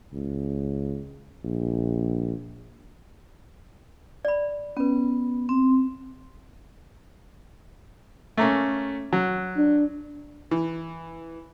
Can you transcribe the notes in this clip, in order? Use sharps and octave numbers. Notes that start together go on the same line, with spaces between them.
C#2
A#1
D5 B5
B3 C#4 B4
C4
A3 A#3 C#4
F#3
D4
E3